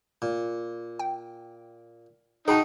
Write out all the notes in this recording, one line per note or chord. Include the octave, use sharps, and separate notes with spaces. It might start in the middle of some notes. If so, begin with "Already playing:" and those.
A#2
G5
D#4 F#4 G#4 G5 A5 A#5